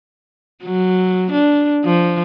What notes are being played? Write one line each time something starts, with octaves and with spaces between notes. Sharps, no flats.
F#3
D4
F3